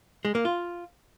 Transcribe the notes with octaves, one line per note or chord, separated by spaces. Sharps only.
G#3
A#3
F4